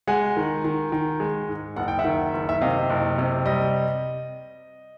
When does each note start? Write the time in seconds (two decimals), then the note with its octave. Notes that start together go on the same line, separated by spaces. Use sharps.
0.07 G#3 F#5 G#5
0.36 D#3
0.64 D#3
0.92 D#3
1.20 G#3
1.48 G#2
1.76 F#1 F#5
1.88 G5
1.99 E5 F#5
2.04 D#3
2.34 F#1
2.49 E5
2.61 C3 D#5 F5
2.90 F#1
3.18 C3
3.46 G3 D#5